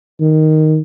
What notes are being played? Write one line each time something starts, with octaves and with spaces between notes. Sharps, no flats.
D#3